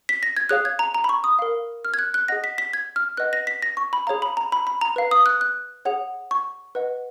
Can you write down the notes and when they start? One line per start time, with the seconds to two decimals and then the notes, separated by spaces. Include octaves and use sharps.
0.09 B6
0.23 A#6
0.37 G#6
0.49 G#4 C#5 F5 F#6
0.65 G#6
0.79 A#5
0.94 A#5
1.04 B5
1.09 C#6
1.24 D#6
1.39 A#4 F5
1.85 F6
1.94 G#6
1.99 F#6
2.14 F#6
2.28 G#4 D#5 F#5 A#6
2.44 B6
2.58 B6
2.73 G#6
2.96 F6
3.17 B4 D#5 F#5 F#6
3.33 A#6
3.47 B6
3.62 A#6
3.77 C#6
3.93 B5
4.07 G#4 C#5 F5 A#5
4.22 B5
4.37 A#5
4.52 B5
4.67 B5
4.81 A#5
4.96 B4 F5
5.11 D#6
5.26 F#6
5.41 F#6
5.85 G#4 C#5 F#5
6.31 C#6
6.75 B4 D#5 F#5